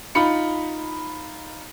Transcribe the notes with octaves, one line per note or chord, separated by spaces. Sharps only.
D#4 F4 B5 C#7